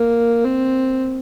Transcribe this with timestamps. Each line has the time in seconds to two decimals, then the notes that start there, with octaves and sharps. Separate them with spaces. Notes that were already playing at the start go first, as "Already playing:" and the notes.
Already playing: A#3
0.45 C4